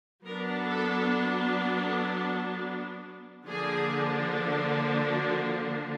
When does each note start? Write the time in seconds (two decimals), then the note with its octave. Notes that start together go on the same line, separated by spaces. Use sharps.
0.25 F#3 B3 D4 A#4
0.66 A4
1.85 A4
3.46 D3 F3 A#3 D4 G#4
5.07 F#4